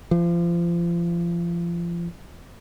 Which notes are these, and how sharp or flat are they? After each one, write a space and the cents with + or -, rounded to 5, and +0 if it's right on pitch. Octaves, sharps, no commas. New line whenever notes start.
F3 -30